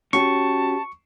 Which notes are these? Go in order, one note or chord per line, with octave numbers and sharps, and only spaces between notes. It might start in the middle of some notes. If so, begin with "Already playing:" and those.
C#4 F#4 G4 A5 C#6